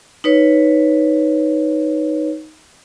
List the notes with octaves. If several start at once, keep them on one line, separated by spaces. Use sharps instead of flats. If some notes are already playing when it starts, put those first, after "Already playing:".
D#4 B4 C#5